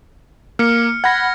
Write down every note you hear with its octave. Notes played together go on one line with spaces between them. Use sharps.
A#3 F6 C#7
F#5 B5 G#6 A#6